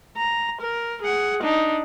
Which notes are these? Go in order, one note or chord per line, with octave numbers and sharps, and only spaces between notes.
A#5
A#4
G#4 F#5
D4 D#4